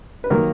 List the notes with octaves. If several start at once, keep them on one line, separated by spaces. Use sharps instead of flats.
B4
D#3 F#3 A#3 A#4